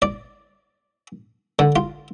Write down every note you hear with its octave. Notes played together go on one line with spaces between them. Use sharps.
D5
D3
F4